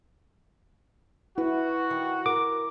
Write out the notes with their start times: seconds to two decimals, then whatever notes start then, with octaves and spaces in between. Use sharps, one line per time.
1.38 E4 F#4 B4
1.90 D#3
2.26 A#4 D6